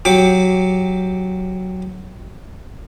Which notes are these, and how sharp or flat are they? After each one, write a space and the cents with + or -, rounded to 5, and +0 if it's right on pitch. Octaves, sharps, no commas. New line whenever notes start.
F#3 +0 G4 +5 D6 +0